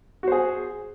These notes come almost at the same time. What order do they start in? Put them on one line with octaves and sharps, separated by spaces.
F#4 C5 G#4